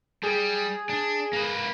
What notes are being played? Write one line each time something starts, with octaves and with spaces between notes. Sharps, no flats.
G3 G#4
D4
A#3 B4